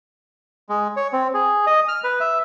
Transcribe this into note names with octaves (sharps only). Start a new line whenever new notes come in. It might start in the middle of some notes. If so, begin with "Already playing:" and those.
G#3
C#5
C4
G#4
D#5
F6
B4
E5